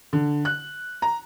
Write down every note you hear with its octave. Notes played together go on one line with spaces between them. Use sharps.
D3
F#6
A#5